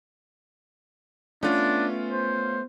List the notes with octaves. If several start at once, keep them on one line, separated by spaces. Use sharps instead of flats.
A3 B3 C#4 D4 F4
C5